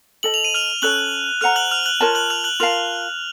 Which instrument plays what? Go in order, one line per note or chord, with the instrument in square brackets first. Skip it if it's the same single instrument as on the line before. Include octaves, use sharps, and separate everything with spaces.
[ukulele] A4 D#5 A5 [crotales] F#7
[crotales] F7
D#7
F6 F7
[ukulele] C#4 A4 C#5 A5 [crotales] F#6 F#7
[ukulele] A4 C5 F#5 A#5 [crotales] F6 F7
[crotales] F#6 F#7
F6 F7
F#6 F#7
[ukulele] F4 A#4 C#5 A5
[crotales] F#6 F#7
F6 F7
F#6 F#7
[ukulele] F4 A#4 F5 A5 [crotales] F6 F7